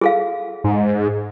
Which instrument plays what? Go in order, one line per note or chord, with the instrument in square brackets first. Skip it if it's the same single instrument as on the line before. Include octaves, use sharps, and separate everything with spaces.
[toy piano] G#4 A4 F5
[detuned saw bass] G#2